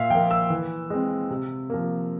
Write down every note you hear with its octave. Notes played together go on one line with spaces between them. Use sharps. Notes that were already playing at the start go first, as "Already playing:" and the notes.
Already playing: A#2 E5 F5
F3 A#3 G5
E6
E3
G#3 C4
C3
F3 A#3